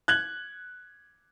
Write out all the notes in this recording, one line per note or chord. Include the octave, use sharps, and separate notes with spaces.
F#6 G#6 F#7